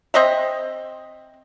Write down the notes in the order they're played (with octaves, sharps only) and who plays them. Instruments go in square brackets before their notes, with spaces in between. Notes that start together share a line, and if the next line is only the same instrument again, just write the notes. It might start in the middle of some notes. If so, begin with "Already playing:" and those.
[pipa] C4 D#5 E5